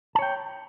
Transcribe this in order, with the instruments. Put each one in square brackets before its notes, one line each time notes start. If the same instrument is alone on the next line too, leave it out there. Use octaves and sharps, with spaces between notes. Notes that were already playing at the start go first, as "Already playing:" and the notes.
[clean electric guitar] A5
C#5
G5